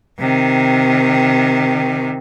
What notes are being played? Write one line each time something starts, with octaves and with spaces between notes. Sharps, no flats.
C3 D#3